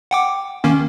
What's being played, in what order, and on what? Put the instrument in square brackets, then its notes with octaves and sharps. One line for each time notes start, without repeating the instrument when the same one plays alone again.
[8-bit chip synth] F#5 G5 D6
D#3 A#3 C#4